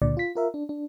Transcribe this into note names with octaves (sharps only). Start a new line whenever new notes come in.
C#2 A#2 D3 D5
F4 B6
F4 A#4 E5
D4
D4